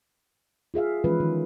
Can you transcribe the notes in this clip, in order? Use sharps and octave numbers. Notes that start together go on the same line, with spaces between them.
F4 G#4 E5 F5
E3 F3 G#3 C#4 F4 B4
D#3